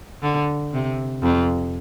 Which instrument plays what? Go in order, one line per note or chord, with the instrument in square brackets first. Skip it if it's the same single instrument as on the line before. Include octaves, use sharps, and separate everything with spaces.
[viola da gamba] D3
C3
F2